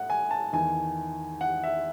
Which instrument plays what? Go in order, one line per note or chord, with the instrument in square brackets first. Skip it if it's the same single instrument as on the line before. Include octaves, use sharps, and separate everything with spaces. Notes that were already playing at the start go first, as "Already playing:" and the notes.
Already playing: [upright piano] A2 F#5
G#5
A5
E2 D#3 G#5
F#5
E5